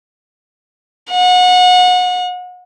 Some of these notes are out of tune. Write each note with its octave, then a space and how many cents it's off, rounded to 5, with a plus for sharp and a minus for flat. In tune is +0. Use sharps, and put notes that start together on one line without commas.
F#5 -30